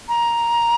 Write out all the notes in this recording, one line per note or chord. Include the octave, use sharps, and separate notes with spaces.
A#5